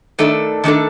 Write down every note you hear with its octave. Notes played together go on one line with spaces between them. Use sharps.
D#3 A3 D4 A4 D5
D#3 A3 D4 A4